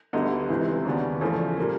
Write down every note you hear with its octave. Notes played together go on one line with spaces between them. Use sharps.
D2 D3 G3 B3 D#4
C#2 C3 E3
D#2 C#3 F#3 B3 D4
E2 C#3 F3 A3
A#2 G3 A#3